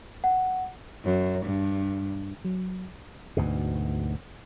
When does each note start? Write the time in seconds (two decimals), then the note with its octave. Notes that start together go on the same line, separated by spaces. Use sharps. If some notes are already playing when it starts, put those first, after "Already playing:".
0.24 F#5
1.05 F#2
1.46 G2
2.45 F#3
3.37 D2 G#2 B2